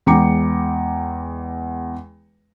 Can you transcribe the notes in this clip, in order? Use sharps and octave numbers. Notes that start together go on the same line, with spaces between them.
E2 G#3 G5 A#5 D6 C#7